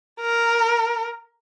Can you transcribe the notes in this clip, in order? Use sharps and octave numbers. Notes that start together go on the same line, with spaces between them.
A#4